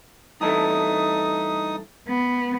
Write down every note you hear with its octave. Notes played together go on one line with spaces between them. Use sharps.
G2 E3 A3 D#4 D#6
B3